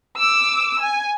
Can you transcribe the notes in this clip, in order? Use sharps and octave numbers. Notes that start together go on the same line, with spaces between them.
D6 E6
G#5